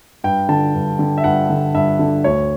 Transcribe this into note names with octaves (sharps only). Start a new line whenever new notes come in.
G2 G5
D3 A5
G2
D3
E5
G2 F#5
D3
G2 E5
D3
D2 C#5